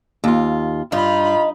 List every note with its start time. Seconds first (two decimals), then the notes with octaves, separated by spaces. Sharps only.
0.24 D#2 F4
0.92 G2 D#4 F4 B5